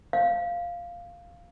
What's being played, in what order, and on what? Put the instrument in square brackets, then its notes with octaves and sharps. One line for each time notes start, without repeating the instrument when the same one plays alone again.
[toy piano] F5